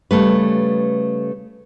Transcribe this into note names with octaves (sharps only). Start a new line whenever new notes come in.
C#3 G3 A3 B4